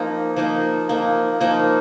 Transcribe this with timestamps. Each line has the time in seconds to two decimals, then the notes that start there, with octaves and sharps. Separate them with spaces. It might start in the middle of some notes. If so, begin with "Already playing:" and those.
Already playing: F3 A#3 D#4
0.36 F3 A#3 D#4
0.89 F3 A#3 D#4
1.41 F3 A#3 D#4